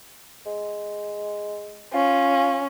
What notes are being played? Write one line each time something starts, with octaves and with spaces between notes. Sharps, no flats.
G#3
C#4 F4